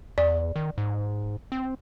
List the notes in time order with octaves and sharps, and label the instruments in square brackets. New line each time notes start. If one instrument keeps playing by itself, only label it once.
[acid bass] E2 [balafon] D5
[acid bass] D#3
G#2
C4